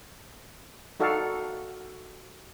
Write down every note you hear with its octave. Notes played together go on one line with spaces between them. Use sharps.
D#4 F#4 A4 D5 F5